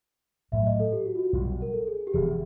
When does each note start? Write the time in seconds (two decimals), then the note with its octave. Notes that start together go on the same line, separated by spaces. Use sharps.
0.52 B1 A2 F#3 A3 E5
0.66 D#5
0.80 A4
0.93 G4
1.05 F#4
1.16 F4
1.19 F#4
1.33 B1 B2 G3
1.62 A#4
1.73 A4
1.87 G#4
2.00 G#4
2.07 G4
2.14 E1 E2 C3 F3 G#4